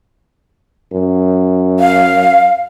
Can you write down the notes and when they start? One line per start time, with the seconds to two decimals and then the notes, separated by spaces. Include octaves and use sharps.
0.92 F#2
1.79 F5